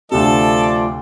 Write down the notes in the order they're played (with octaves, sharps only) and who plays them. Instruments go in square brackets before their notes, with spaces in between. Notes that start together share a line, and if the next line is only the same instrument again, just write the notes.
[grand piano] D2 C3 [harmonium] F3 A3 F4 [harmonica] A4 [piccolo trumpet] D5